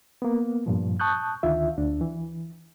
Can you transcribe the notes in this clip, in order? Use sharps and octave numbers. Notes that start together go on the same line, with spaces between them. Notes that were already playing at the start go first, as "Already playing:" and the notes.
A#3 B3
G2 A#2 F3
A5 C#6 D#6 F#6 G6
D2 D3 D#3 F4 E5
D2 D4
E3